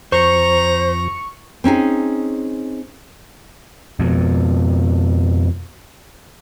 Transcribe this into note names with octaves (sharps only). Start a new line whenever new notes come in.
F2 C5 A#5 C#6
C4 C#4 D#4 G#4
F2 B2